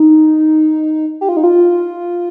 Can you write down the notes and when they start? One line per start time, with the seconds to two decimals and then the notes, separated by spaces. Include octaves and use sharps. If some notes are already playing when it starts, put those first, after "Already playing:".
Already playing: D#4
1.21 G4
1.29 F4
1.37 D#4
1.44 F4